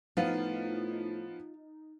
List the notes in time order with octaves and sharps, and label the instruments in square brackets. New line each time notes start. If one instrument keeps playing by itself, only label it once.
[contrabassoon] A2 [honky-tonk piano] F3 B3 [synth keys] D#4 [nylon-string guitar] F4 F5